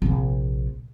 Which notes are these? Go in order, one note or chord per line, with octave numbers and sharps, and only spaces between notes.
A#1 C3